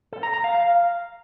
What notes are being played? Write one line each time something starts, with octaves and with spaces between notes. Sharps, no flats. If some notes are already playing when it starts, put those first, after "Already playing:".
A4
A#5
A#5
F5
F5